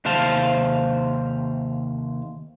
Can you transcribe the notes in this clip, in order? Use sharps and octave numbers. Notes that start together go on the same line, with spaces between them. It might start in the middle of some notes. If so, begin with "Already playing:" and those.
D#2 C3 C5 F5 A5